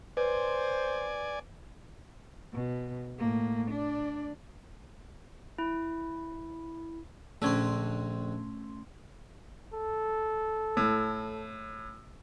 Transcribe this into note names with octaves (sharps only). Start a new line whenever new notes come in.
B4 C5 D5 G#5
B2
A2 A#3
D4 D5
E4
A#1 D3 A3 C4 C#4 C6
A4
A2